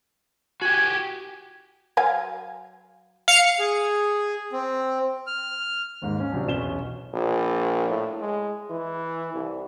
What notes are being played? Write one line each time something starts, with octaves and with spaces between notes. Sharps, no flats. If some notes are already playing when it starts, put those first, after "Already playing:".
F#4 G4 G#5
F#3 F5 G#5
F5 C#7
G#4
C4
F6
D#2 G#2
C#4
C3 F#3 D4
B1 E2 B2 C#4 E7 G7
A#1
A2
G#3
E3
C2